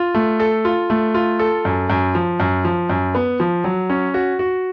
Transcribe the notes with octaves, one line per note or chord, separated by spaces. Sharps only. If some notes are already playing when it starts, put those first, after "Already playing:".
Already playing: F4
A3
A4
F4
A3
F4
A4
F#2
F#2
F3
F#2
F3
F#2
B3
F3
F#3
C#4
F#4
F#4